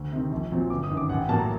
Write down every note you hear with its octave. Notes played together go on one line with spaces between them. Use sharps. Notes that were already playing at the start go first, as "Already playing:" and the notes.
Already playing: D2
C3 D#3
A#1
A#2 F#3 C4
G1 D6
D#6
F#2 D#3
D6
A1 F#5
G5
A2 F#3 A#3 A5
A#5